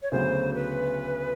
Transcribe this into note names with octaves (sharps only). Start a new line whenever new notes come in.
C#5
D2 C#3 F#3 B3 C5
B4